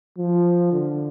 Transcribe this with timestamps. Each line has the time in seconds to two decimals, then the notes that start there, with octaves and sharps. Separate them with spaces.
0.18 F3
0.72 D3